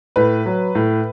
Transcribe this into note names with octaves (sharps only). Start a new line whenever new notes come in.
A2 B4
F#3
A2